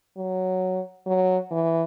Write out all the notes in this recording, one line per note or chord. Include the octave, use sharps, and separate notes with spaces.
F#3
F#3
E3